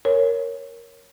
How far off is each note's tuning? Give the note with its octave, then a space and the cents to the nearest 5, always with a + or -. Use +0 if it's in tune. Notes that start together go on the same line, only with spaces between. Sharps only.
A#4 +0 C#5 +0